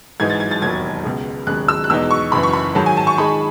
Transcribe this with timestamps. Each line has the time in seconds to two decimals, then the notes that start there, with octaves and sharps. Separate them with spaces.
0.20 G#2 E3 G#3 D#4 G#6
0.30 A6
0.40 G#6
0.51 A6
0.62 E1 D#2 D#3 F#3 G#6
1.04 C#2 B2 G#3
1.47 E1 D#2 C#3 G#3 F#6
1.68 E6
1.84 F#6
1.90 E2 B2 G#3 D#4 E6
2.11 C#6
2.32 F#1 F#2 E3 B5
2.43 C#6
2.53 B5
2.75 G#2 D#3 F#3 A5
2.86 G#5
2.97 A5
3.07 C#6
3.17 D#3 G#3 D#4 G#4 B5